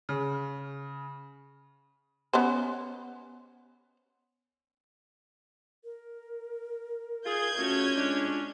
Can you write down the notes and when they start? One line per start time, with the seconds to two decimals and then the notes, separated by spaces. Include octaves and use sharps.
0.09 C#3
2.33 B3 C#4 C5
5.84 A#4
7.26 F4 G#4 G6 G#6
7.59 A3 C#4 F4 F#4
7.97 G#3 D4